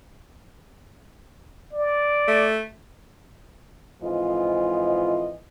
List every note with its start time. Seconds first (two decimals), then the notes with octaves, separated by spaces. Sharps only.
1.73 D5
2.28 A3
4.02 F2 G#2 E3 F4 D#5